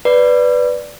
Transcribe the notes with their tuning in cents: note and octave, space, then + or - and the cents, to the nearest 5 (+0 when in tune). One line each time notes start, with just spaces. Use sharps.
B4 +0 D5 +0